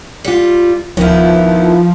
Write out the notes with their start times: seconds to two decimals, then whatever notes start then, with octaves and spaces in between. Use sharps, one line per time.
0.24 G3 F4
0.97 D1 D#3 F3 B3 E4